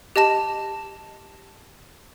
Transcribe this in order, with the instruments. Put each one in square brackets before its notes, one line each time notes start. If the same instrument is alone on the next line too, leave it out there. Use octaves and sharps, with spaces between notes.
[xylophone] G4 D#5 A5 E7